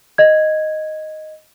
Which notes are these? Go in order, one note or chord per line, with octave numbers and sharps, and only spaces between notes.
D#5 G#6